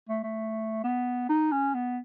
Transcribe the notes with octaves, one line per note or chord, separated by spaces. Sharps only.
A3
A3
B3
D#4
C#4
B3